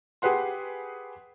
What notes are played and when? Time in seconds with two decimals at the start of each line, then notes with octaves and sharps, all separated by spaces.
0.22 G4 G#4 B4 F#5 C6